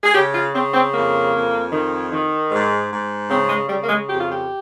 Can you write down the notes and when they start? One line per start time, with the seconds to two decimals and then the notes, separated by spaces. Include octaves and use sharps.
0.04 G#4
0.15 C#3 G4
0.35 F4
0.54 C#3 C4
0.74 C4
0.94 F2 A#3
1.33 F2
1.72 D#3
2.12 D#3
2.51 G#2
2.90 G#2
3.30 C#3 C4
3.49 G#3
3.69 C#3 G3
3.84 A#3
3.89 G#3
4.09 F2 G4
4.20 F4
4.32 G4